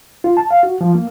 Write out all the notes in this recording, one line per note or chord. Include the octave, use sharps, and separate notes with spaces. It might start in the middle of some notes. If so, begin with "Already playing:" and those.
F4
A5
F5
F#4
F3
A#3